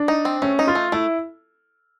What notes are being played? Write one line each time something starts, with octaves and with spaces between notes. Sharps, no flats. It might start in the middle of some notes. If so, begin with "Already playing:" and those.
Already playing: D4
D#4
C4
A3 C#4
D#4
F4
A3
A3 E4